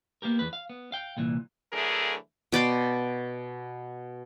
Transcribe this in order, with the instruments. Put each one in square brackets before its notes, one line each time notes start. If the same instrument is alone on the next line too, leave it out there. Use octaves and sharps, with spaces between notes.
[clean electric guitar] A#3 B3 G4 A#4
E2 B4
F5
B3
F5 G5
C2 A#2 E3
[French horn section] D3 E3 F#3 A3 G#4 A#4
[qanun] B2 D5 G5 C6